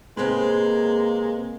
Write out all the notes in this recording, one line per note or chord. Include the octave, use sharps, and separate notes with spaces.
C3 G#3 A#3 B4